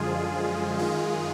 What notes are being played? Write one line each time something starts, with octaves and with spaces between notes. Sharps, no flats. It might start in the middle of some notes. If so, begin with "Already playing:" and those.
Already playing: F#2 D3 F3 G#3 F4 G#4
F#2 D#3 G#3 F4 G#4